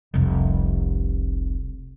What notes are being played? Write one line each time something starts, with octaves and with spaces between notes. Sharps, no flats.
F1 C2